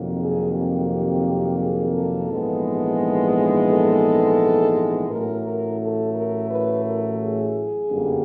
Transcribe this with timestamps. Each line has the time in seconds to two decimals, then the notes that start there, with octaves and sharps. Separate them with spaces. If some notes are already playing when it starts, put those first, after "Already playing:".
Already playing: F2 C3 D#3 F#3 A#3
0.17 G#4
0.53 G4
0.88 G4
1.57 G#4
1.93 A4
2.28 A#1 G#2 E3 G#3 B3
3.68 A4
5.09 A1 A2 F#3 A3 A#4
5.44 A#4
5.80 A4
6.15 A#4
6.49 B4
6.85 A#4
7.19 G#4
7.90 G1 F#2 D3 G3 A#3